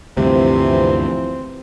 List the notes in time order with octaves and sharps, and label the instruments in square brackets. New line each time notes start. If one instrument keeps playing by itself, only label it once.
[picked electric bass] D2 G2 [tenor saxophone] C3 [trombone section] E3 F3 [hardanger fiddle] C4